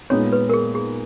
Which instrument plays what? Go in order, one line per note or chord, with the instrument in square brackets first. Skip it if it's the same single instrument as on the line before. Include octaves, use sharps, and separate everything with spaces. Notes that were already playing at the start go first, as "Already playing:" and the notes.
[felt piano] A#2 G#3 B3 D#4 [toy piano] C#5
[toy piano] B4
A#4
G#4
G#4